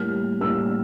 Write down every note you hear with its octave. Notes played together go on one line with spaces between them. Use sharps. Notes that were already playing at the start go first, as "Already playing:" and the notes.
Already playing: A2 G3 A#3 F6
A2 G3 A#3 E6